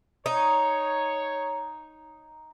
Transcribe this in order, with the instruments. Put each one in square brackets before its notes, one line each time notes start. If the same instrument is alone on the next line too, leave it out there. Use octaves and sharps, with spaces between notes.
[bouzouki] D#4 [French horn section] C#5